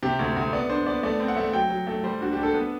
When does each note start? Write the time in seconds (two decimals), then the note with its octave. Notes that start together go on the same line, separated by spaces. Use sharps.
0.03 C3 G4
0.19 D2
0.36 D2
0.53 B3 D5
0.70 D4 C5
0.86 B3 D5
1.03 A3 D5
1.20 C4
1.28 F#5
1.37 A3
1.53 F#3 G5
1.70 F#3
1.87 A3
2.03 G3 C5
2.20 D4 F#4
2.33 D4 G4
2.43 A4
2.54 B3 B4